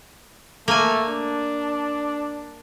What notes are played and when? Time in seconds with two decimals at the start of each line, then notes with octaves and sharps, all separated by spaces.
0.68 A3 A#3 G#5
1.08 D4